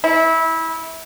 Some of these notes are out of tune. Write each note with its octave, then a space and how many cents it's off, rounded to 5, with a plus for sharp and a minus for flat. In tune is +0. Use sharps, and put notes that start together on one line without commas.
E4 -20